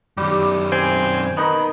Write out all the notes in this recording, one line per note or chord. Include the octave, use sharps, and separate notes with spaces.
F#2 D#3 G3 G4
C4 G#5
D#3 B3 D#4 B5